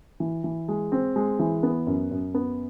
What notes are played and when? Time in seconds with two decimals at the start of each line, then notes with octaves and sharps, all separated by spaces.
0.20 E3
0.44 E3
0.68 G#3
0.92 C4
1.16 G#3
1.39 E3
1.63 B3
1.87 F#2
2.11 F#2
2.34 B3